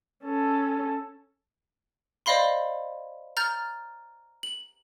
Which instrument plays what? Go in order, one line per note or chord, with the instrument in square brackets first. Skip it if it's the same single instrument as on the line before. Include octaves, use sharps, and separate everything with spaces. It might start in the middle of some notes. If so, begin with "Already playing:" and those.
[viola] C#4 A4
[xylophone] C5 D5 D#5 F5 B5 C6
A#5 F6 G6 A6
F#7